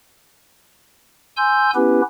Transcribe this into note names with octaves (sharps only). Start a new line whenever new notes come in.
G#5 C6 E6 G6
B3 C#4 E4 G4 B4